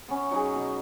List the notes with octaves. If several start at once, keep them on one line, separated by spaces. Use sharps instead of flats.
B3 C#4
F#3 D#4 F#4 G#4
B2